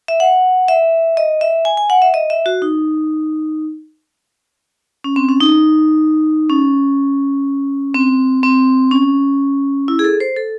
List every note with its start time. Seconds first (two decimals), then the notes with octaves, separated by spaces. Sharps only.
0.08 E5
0.20 F#5
0.68 E5
1.17 D#5
1.41 E5
1.65 G#5
1.77 G#5
1.90 F#5
2.02 E5
2.14 D#5
2.30 E5
2.46 F#4
2.62 D#4
5.04 C#4
5.16 C4
5.29 C#4
5.41 D#4
6.49 C#4
7.94 C4
8.43 C4
8.91 C#4
9.88 E4
9.99 G#4
10.04 A4
10.20 C5
10.37 A4